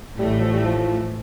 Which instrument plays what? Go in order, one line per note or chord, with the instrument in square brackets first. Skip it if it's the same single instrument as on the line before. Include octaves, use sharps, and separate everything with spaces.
[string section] A1 A2 E3 A3 [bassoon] G3
[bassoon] G3
F3
G3
F3